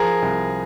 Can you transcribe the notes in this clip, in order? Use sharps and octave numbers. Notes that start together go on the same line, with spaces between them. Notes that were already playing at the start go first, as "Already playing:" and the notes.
Already playing: F3 G#4 A#4
C2